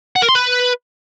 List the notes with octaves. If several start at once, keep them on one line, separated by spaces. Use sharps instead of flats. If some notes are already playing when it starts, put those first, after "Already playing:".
F#5
A#4
C6
B4